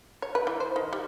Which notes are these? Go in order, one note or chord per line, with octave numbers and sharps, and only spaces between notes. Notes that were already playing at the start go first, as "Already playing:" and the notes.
C#5
B4
E3
C5
D#3
G3